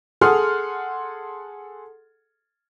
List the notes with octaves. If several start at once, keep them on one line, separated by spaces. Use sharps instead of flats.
G#4 A4 F#5 C6 D#6 F6